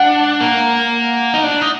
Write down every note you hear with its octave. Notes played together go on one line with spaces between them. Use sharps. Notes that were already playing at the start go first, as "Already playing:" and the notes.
Already playing: D4 F#5
A#3
D#4
D4
D#4